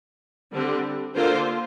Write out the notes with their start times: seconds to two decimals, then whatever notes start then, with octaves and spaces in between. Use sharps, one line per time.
0.52 D3 G3 C4 G4
1.14 D3 A#3 F4 C5